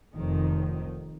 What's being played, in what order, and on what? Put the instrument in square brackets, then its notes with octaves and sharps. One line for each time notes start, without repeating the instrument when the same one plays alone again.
[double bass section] F1 F2 D#3